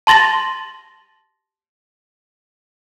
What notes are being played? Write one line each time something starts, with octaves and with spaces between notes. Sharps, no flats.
A5 C6 A6 A#6 F#7